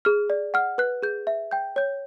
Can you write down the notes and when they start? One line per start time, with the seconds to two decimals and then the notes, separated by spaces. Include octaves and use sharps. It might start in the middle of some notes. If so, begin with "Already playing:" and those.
0.05 G#4 F6
0.30 D5
0.54 F#5 F6
0.78 B4 F#6
1.03 G#4 G6
1.27 E5
1.51 G5 G6
1.76 C#5 G6